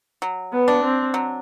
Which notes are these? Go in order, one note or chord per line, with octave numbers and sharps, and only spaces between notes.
F#3
B3
D4
C4
F#3